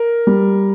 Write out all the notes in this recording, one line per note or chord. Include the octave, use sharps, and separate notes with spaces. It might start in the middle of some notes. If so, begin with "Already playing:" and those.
Already playing: A#4
G3